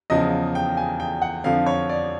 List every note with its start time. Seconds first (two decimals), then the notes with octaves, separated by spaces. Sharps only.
0.10 E2 C#3 F3 D#5
0.55 G5
0.77 G#5
1.00 G5
1.22 F#5
1.44 F2 D3 F3 F5
1.66 C#5
1.89 D5